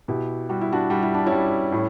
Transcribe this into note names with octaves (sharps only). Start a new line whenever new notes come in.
B2 E4 G4
G3 F#4
E4
D4 F#4
G3 F#4
E4
D4
G3 C#4 E4
A2